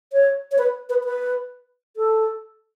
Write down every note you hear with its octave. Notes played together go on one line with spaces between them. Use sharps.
C#5
C#5
B4
B4
B4
A4